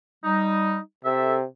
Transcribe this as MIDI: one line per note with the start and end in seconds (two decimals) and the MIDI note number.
0.24 0.78 55
0.24 0.78 63
1.05 1.46 48
1.05 1.36 69
1.05 1.36 76